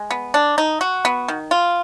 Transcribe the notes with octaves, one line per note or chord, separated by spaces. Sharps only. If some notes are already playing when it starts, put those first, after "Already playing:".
Already playing: G#3
B3
D4
D#4
F#4
B3
D#3
F4